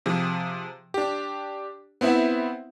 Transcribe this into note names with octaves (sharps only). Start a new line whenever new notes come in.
C3 F3 G#4
D4 G4
B3 C4 E4 E5 F#5